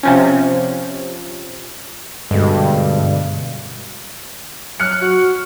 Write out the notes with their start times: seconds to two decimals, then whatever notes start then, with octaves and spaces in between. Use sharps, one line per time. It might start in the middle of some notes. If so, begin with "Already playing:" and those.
0.03 C3 F3 C#4
2.31 G2 B2 D3 G#3
4.80 F#3 F6 F#6 C#7
5.02 F#4